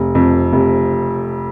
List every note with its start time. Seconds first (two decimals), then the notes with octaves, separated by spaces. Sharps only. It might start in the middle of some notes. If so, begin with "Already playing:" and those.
Already playing: F1
0.15 F2
0.53 F1